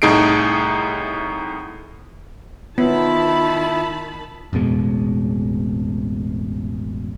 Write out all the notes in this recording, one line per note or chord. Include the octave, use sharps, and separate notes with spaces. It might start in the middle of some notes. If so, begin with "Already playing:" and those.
C2 A2 D#4 G#4 C7 D7
D#3 B3 E4 F4 A5 B5
A1 F2 B2 G#3